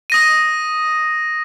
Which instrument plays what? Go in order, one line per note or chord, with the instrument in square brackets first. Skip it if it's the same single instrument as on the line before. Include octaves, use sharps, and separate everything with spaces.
[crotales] D#6 A#6 D#7